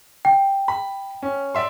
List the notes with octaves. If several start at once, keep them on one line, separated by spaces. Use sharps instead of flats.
G5
B5
C#4
D5 E5 C6